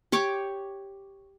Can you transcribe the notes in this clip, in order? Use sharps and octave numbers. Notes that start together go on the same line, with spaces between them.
G4 C#5 C#6 D6